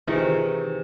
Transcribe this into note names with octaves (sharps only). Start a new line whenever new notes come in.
C3 D#3 E3 F4 G#4 C5 C#5